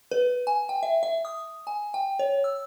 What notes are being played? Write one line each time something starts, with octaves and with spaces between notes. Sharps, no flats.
B4
G#5
G5
E5
E5
D#6
G#5
G5
C#5
E6